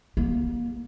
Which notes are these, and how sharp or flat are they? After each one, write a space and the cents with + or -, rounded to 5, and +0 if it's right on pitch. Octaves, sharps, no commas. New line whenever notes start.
A#3 +40